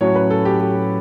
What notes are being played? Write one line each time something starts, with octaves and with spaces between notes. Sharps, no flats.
A2 F#3 C#4 F#4 C#5
B4
A4
G4
G4